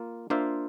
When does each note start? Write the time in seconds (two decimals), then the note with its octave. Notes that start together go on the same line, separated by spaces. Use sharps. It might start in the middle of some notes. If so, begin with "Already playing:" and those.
Already playing: A#3 F4
0.30 A#3 D4 F4 C5 E5